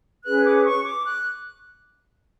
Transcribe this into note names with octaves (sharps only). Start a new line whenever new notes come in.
C#4 G#4 B4 F#6
D6
C#6
D6
F#6